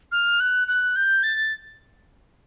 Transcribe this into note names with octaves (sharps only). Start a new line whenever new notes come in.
F6
F#6
F#6
G6
A6